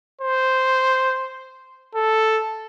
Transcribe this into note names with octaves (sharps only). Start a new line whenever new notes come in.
C5
A4